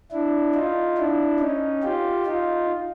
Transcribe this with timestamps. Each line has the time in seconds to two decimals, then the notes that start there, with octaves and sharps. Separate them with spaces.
0.12 D4 E4
0.55 D#4 F4
0.98 D4 E4
1.40 C#4 D#4
1.83 F4 G4
2.26 D#4 F4